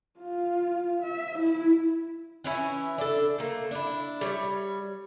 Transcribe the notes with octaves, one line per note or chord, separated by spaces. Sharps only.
F4
E5
E4
E3 C#4 E4
D4 A4
A3 A#3
D4 E4
G3 C#5